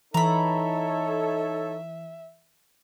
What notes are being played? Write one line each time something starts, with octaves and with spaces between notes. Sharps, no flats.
E3 D#4 A4 C#5 E5 A#5 B5